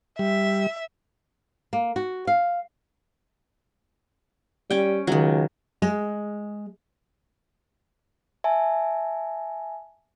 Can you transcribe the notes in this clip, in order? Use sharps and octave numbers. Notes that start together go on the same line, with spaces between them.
G3 E5
A#3
F#4
F5
G3 C#4 G5
C#2 D#3 F#3
G#3
E5 G#5 A5